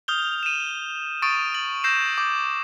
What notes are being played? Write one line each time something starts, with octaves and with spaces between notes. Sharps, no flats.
D#6 F6 G6 F7 G7
D#7 E7
C#6 D#6 A6 D7 D#7
A6 F#7
E6 G6 A#6 C7 E7
D6 G6